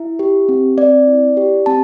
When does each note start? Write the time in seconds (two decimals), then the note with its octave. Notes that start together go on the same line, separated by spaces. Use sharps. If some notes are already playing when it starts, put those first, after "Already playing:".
Already playing: E4 E5
0.19 G4
0.49 C4
0.78 C4 D5
1.07 E4
1.37 G4
1.66 C4 A5